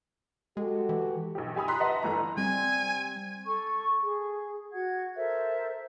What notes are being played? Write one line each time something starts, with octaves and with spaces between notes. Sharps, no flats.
G#3 F#4 G4 A4
E3
B1 F2 G4
G4 G#5 B5 D#6
A#5 C6 D#6 F#6 B6
B4 D#5 E5 F#5 A5 C6
G1 E3 A3 A#5
G3 C4 G#5
A4 C#6
G#4
F#4 F#5 G#6
A4 A#4 C5 E5